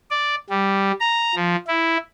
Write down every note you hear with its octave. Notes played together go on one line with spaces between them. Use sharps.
D5
G3
A#5
F3
E4